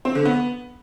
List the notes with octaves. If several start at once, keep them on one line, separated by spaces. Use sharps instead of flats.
C4
D3
B3